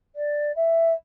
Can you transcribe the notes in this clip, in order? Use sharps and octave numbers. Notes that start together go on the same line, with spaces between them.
D5
E5